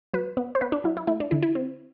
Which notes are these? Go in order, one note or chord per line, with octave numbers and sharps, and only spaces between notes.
F#3 B4
B3
C5
B3 B4
D4
F#3 E4
E4
A3 E4
D4
D3 E4
E4
C4